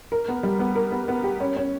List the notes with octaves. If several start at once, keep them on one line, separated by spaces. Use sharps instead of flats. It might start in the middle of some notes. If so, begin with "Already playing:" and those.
A#4
B3
G3
B3
A#4
B3
B3
G4
C#4
C#4